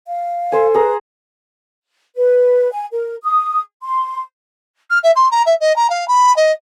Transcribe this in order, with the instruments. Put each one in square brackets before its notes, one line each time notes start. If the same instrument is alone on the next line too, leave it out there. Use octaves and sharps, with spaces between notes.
[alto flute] F5
[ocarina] A4 [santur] C5 G#5
[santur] G#4 A#5 [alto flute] B4
[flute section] B4
G#5
A#4
D#6
C6
[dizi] F6
E5
C6
A#5
E5
D#5
A#5
F5
B5
D#5